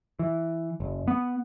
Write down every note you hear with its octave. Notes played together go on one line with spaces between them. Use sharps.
E3
F#1
B3